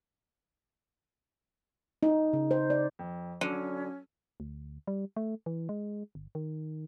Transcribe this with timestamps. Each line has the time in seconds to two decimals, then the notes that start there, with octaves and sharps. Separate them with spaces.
2.03 D#4
2.33 C#3
2.51 C5
2.70 D5
2.99 F2
3.41 D3 F#3 C#4
4.40 D2
4.87 G3
5.17 A3
5.46 E3
5.69 G#3
6.15 G1
6.35 D#3